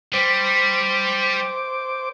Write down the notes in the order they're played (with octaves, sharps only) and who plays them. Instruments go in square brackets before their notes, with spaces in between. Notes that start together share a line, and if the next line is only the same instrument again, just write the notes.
[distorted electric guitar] G3 [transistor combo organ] C5 D6